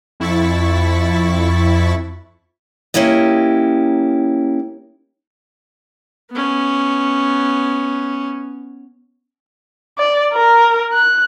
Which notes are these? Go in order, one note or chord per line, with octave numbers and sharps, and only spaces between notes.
F2 E4 C#6 A6 B6
A#3 C#4 E4 G4 D#5
B3 C#4
D5
A#4
F#6